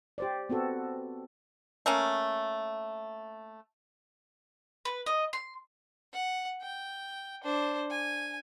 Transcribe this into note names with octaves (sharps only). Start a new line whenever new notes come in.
G4 C5 D5
B3 C4 F#4 A4
A3 A#3 C#4
B4
D#5
C6
F#5
G5
D4 C5
G#5